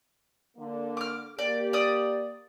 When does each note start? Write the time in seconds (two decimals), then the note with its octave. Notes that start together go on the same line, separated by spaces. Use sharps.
0.57 D3 A#3
0.97 D6 F6
1.39 A#3 G4 D5
1.73 D5 D#6